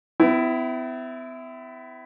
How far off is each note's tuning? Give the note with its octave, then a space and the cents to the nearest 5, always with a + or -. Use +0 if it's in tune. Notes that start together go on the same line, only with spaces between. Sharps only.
B3 +45 E4 +0